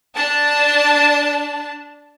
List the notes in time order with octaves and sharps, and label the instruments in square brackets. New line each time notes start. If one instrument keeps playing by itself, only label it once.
[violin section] D4 A5